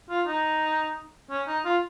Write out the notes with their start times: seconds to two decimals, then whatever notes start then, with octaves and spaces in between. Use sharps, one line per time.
0.10 F4
0.27 D#4
1.31 C#4
1.48 D#4
1.65 F4